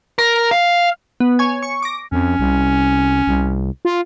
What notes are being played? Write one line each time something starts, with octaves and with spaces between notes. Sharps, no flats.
A#4
F5
B3
C#5 G#5
C#6
D6 A#6
F2 C#4
C2
C2
F4